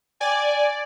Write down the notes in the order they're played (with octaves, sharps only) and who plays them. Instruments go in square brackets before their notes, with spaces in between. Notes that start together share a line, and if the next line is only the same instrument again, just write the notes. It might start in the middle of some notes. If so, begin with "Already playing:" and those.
[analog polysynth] D5 [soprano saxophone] G#5